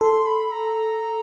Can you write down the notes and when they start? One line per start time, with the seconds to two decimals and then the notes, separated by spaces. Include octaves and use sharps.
0.01 A4 C6
0.26 B5
0.52 A#5